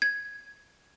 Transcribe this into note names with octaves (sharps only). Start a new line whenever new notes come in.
G#6